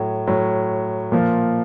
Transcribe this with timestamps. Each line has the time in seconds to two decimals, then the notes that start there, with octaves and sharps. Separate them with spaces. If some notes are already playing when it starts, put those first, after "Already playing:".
Already playing: A2 F#3
0.27 A2 F#3
1.12 A#2 F3